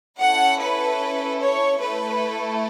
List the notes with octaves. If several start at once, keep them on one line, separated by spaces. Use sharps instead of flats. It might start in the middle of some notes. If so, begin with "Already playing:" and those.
C#4 E4 A4 F#5
B4
C#5
A3 E4 A4 B4